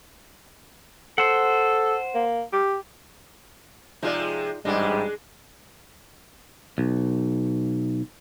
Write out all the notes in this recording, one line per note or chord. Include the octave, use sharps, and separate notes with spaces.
A4 C5 F#5
A#3
G4
C3 F3 G#3 D#4 F4 D5
A1 G#2 G3 G#3 D4 D#5
B1